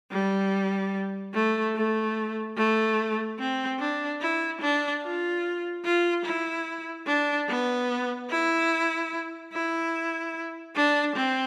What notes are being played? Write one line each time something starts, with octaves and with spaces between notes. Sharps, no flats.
G3
A3
A3
A3
C4
D4
E4
D4
F4
F4
E4
D4
B3
E4
E4
D4
C4